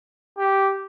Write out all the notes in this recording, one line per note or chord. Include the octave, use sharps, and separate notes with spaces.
G4